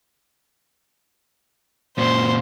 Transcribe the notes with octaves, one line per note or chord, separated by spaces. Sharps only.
F#2 A#2 C5